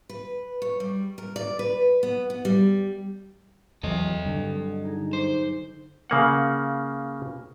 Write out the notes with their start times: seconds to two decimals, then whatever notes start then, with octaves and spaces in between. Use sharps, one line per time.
0.09 B4
0.62 C#5
0.80 G3
1.18 A#4
1.36 D5
1.59 B4
2.03 B3
2.30 B3
2.45 G3
3.83 E2 E3 F#3 A4 C5 D#5
4.25 G2 D3 F#3
4.84 D#4 G#4
5.13 C5 D6
6.10 C#3 A#3 F#5